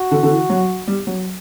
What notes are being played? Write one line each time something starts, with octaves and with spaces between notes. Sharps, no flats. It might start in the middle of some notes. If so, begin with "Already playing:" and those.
Already playing: F#4
D3
D3
E3
F#3
G3
F#3